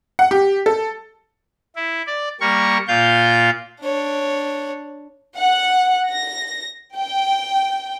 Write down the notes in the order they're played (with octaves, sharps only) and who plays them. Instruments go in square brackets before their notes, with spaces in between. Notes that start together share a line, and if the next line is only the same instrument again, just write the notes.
[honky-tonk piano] F#5
G4
A4
[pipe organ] E4
D5
G3 A#3 A#4 C#6
A#2 F4 F5 G6
[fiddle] D4 C#5
[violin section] F#5
A#6
G5